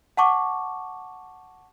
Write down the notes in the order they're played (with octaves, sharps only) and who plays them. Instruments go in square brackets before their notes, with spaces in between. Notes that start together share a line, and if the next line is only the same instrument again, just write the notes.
[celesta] F#5 A5 C#6 D6